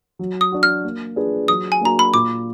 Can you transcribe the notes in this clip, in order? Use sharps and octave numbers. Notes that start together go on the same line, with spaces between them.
F#3
D#6
D4 F#4
F6
A#3
D4 F4 G#4 B4
F#3 D#6
G#5
A#3 D4 F#4 A#5
B5
A#2 D6